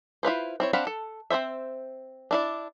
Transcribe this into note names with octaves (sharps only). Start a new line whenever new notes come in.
E4 F4 B4 C5
C4 E4 C#5
C4 D4 F5 F#5 B5
A4
C4 F4 C5 E5
D4 E4 D5